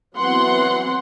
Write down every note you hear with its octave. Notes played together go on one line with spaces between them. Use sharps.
E3 F#3 B3 C4 F#5 C6